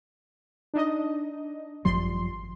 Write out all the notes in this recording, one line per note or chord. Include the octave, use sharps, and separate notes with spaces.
D4 D#4 D#5
G#1 F#2 F3 G3 C6